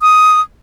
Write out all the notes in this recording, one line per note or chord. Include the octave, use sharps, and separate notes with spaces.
D#6